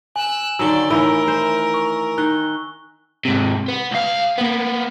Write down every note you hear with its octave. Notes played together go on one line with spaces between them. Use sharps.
G#5 E6 F#6
D3 D#3 F#3 D5 E6 E7 G7
A2 D#3 E3 A#4 E6
C5
C#6
D#3 F#6 G7
G#2 C3
B3
C#2 F5
A#3 B3